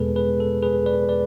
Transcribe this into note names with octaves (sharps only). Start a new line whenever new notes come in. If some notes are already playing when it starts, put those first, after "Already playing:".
Already playing: E2 B2 G#3 B3 G#4 A4 B4
G#4 B4
A4
G#4 B4
B4 D5
B4 D5